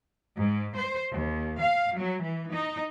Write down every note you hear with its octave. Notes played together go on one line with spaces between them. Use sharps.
G#2
C5
D#2
F5
F#3
E3
D#4